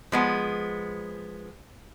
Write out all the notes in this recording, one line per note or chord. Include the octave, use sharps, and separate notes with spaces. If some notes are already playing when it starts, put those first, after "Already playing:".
F3 G#3 B3